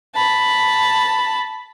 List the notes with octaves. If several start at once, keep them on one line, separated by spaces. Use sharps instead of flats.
A5 B5